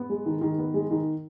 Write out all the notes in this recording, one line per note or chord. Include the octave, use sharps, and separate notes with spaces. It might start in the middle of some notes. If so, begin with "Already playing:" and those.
Already playing: B3
G#3
D#3
D#3
B3
G#3
D#3